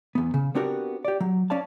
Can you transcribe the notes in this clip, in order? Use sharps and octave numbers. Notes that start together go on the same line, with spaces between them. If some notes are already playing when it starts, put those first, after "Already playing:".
E2 B3
C#3
B3 C4 D4 F#4 G4 A#4
G4 D5
F#3
C#4 D5 F5 A5